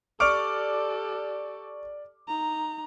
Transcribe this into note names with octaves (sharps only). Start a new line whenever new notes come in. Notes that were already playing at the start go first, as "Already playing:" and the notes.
G4 A4 D5 C#6 D6 F6 D7
D#4 A#5